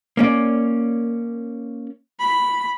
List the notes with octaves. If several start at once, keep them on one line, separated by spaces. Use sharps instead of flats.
A#3 C#4 D5
B5